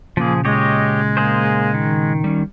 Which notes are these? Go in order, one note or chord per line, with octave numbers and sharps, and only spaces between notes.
A#2 C#3 F3 A#3 G#4
G#3 G4 C#5 D#5
A#3 G#4 C5
D#3
G3 C#4